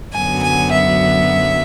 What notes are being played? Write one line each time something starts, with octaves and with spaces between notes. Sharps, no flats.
F#2 D3 F#3 B3 G#5
G#5
E5